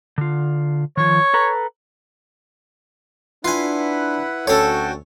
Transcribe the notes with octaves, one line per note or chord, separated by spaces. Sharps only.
D3 F4
D#3 F3 C#5
A4 B4 A#5
D4 E4 F4 B4 F#5 G#5
D2 C#4 F#4 A4 C#5 G5